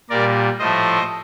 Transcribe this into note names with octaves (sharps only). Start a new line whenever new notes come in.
A#2 G3 A#4 D5
A2 F3 A3 C5 D#5